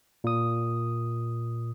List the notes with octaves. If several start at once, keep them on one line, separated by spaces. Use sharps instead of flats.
A#2 D#6